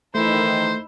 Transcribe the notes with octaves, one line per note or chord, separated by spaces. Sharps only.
D#3 E3 A3 D#4 E4 C5